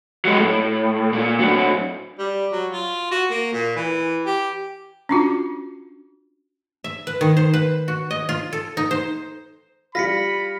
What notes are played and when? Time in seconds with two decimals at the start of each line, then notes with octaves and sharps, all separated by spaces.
0.25 F#3 G#3
0.38 A2
1.13 A#2
1.40 A2 F#3
2.18 G3
2.52 F#3
2.72 F4
3.11 F#4
3.30 A#3
3.53 A#2
3.76 E3
4.26 G4
5.09 C#4 D4 F4 F#4
6.84 E5
7.07 B4
7.21 D#3
7.37 C5
7.54 B4
7.88 F#4
8.11 D#5
8.29 F4
8.53 A4
8.77 D#4
8.91 C5
9.95 G3 F4 B5 A#6 B6 C#7